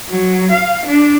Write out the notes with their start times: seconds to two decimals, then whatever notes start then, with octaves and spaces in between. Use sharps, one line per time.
0.10 F#3
0.52 F5
0.87 D4